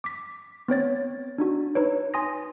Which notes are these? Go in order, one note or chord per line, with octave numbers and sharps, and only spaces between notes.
D6 B6
B3 C4 C#5 A6
D4 D#4 F#4
D#4 B4 C#5
G#5 C6 D#6 A#6